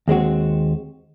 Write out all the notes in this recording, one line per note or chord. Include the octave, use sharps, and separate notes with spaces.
D#2 G#3 C4 F#4